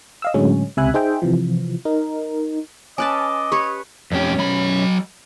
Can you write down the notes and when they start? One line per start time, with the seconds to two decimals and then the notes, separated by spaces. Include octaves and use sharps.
0.22 D#5 F5 E6
0.34 A2 D3 F#3 G#3 C#4
0.77 C#2 C3 E5 G#5 B5 F#6
0.94 D#4 G#4 C5 E5 G5
1.22 C3 E3 F3
1.85 D#4 A#4
2.98 C#4 B4 D#5 G#5 A5 D6
3.52 G4 B4 C#5
4.12 B1 F2 C#4 G4
4.39 F#3 B5